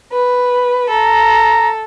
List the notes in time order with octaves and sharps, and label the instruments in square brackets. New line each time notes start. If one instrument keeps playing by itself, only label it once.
[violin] B4
[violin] A4 [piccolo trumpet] A#5